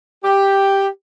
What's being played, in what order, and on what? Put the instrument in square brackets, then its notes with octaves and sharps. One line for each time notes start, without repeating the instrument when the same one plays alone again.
[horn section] G4